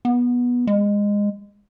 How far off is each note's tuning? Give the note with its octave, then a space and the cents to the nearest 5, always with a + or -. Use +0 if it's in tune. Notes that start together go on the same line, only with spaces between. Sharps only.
B3 -15
G#3 -20